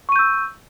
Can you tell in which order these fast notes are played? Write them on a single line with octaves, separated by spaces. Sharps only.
C#6 D#7 G6 E6